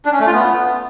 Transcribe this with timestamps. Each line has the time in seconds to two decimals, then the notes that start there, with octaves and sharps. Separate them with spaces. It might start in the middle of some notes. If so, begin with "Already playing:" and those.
0.06 D4
0.13 C#4
0.20 A3
0.27 F4
0.34 B3